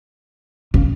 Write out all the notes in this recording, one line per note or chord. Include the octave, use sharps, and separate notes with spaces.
C#3